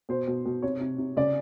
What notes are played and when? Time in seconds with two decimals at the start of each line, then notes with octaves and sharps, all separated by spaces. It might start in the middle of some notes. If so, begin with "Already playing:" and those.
0.09 B2 C5
0.27 B2
0.46 B2
0.62 C3 C#5
0.80 C3
0.98 C3
1.17 C#3 D5